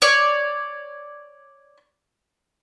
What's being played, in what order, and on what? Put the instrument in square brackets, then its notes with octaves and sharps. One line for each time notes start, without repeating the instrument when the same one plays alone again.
[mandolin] C#5 D5